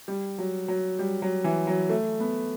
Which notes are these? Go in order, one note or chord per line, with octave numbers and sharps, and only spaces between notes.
G3
F#3
F#3
G3
F#3
E3
F#3
A3
B3